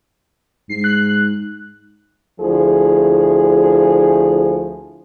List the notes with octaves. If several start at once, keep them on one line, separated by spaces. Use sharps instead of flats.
G#2 C7
F#6
D2 F3 E4 G#4